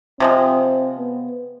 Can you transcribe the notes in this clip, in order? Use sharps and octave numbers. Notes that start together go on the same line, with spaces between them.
C3 F3 G#3 C4
B3